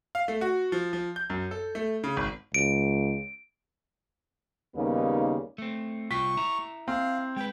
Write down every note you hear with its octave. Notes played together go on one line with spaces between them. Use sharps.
F5
A3
F#4
F3
F3
G6
F#2
A4
A3
C#3
G#1
C#2 D7
D#2 C#3 G3 A#3 B3 D#4
A3 C4
C2 F4 G5 C#6 B6
E4 E5 A#5
C4 F5
G#3 B4 G5